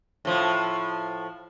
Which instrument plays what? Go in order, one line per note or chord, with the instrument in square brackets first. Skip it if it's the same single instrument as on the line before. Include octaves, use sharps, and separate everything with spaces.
[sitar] A2 F3